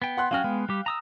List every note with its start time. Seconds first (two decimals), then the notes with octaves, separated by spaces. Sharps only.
0.02 B3 G5
0.17 F#5 C6 F#6
0.31 F#3 C#4 F#4 F5 G5 F6
0.44 G#3 B3
0.69 G3 G4
0.86 A#5 D#6 E6